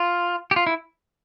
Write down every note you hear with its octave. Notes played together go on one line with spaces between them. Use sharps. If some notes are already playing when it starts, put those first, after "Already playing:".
Already playing: F4
G4
F4
E4